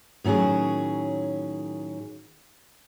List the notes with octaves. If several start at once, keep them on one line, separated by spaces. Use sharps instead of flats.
A2 D#3 F#3 C#4 G#4